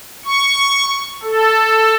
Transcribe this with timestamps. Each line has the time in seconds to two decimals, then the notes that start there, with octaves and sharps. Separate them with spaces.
0.25 C#6
1.23 A4